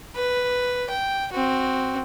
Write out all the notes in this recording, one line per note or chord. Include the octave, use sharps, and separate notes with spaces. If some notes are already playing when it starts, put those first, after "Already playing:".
B4
G5
C4 F#4